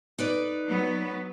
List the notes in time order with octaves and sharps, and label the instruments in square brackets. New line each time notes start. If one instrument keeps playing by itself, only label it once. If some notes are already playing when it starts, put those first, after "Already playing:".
[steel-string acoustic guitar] D#4 B4 D5
[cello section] F#3 B3